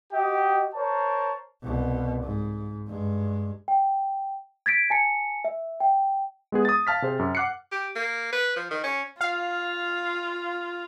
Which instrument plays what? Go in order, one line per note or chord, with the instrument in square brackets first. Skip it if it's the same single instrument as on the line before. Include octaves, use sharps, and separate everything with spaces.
[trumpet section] F#4 G4 D#5 G5
A#4 C5 C#5 A5
[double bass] C2 B2
G#2
G2 G#3
[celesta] G5
G#6 A6 B6 D7
G#5 A5 C#7
E5
G5
[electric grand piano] G#3 B3 G#4
D#6 A6
F5 A5 F6 B6
C3 G#4 C5
F#2
F#5 D6 F#6 C7 C#7
[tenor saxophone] G4
A#3
B4
F3
D#3
C#4
[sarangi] F4 [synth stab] F5